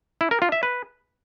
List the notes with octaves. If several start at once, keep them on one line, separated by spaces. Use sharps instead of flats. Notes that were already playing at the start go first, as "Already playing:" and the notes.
E4
A#4
F4
E5
B4